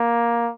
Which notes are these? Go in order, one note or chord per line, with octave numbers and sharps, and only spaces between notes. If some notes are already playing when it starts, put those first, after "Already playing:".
Already playing: A#3